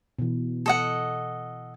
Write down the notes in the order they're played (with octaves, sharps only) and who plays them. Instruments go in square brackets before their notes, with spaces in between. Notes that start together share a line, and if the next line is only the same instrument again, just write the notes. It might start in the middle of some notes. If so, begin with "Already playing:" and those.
[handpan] B2 E3
[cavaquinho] A4 D#5 F#5